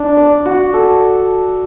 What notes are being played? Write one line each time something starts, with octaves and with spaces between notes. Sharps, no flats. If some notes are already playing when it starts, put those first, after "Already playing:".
Already playing: D4
D5
F#4
A4